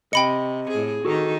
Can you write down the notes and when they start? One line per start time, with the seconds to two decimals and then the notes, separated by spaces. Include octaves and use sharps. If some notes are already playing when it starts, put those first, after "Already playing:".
0.13 C3 D#5 G5 B5 C#7
0.70 A2 G#4
1.05 D#3 D#4 F#4 A4